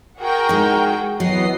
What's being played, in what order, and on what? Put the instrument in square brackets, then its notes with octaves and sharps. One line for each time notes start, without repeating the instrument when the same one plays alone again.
[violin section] F#4 G#4 G5 [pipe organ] A#4
[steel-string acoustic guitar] G#3 D#4
[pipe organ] E3 B3 [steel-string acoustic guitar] F#3 [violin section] D#5 C7